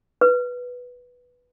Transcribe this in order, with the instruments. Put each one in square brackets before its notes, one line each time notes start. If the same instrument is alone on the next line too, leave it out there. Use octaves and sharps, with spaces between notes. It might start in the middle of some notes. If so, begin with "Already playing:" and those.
[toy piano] B4